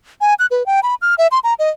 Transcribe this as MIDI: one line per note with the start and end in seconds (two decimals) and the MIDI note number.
0.21 0.34 80
0.39 0.46 90
0.51 0.66 71
0.66 0.80 79
0.83 0.95 83
1.02 1.15 89
1.18 1.27 76
1.31 1.39 84
1.44 1.54 82
1.59 1.69 75